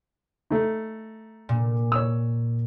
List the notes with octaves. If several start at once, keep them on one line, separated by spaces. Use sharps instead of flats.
A3 D#4
A#2
C#5 E6